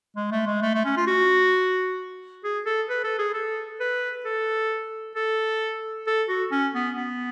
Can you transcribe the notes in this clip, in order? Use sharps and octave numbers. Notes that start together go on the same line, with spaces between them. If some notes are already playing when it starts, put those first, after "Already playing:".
G#3
A3
G#3
A3
A3
C#4
F4
F#4
G#4
A4
B4
A4
G#4
A4
B4
A4
A4
A4
F#4
C#4
B3
B3